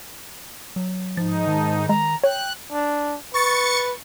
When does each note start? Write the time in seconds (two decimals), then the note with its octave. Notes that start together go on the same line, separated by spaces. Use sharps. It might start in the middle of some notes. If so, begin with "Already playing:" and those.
0.76 F#3
1.17 G#2 F3 D#4 A6
1.47 D#3 A5
1.89 G#3 A#5
2.24 C#5 G5 F#6
2.72 D4
3.34 B4 C#6 A6 C#7